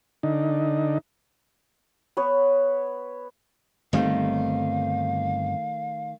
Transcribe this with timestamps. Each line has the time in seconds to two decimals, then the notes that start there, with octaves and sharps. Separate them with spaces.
0.23 D3 D#4
2.17 B3 B4 C#5
3.93 G1 D#3 G3 A3 C4 D#4 F5